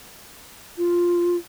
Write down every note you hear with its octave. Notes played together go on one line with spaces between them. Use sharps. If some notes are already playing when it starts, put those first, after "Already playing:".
F4